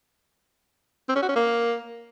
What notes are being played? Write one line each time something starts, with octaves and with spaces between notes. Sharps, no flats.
C4
C#4
F#4
C#4
A#3